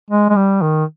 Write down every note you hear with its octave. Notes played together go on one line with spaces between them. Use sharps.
G#3
G#3
G3
D#3